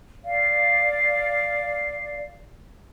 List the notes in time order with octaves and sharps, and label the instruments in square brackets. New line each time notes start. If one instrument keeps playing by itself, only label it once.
[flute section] D5 F5